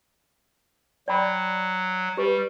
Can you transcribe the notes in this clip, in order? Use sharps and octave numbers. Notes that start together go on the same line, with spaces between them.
F#3 D5 G5 B5
G3 G4 B4